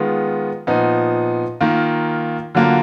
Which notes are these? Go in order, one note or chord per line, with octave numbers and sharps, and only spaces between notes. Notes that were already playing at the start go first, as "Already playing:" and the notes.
Already playing: D#3 G#3 B3 F4
A#2 F3 B3 D#4
D#3 A#3 F4
D3 F#3 A#3 F4